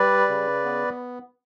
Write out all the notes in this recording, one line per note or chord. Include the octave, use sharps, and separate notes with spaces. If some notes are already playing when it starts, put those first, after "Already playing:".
Already playing: G3 B4 D5
C#3
B3